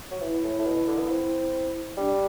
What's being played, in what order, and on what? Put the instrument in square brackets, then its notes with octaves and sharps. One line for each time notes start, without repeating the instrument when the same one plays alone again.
[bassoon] F#3
[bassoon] E3 [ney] E4
[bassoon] A2
A2
B2
D3
B3
C4
[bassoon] G3 [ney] D4